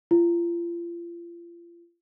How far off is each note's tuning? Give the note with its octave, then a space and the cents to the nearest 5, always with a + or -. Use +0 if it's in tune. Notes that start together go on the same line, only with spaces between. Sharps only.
F4 -35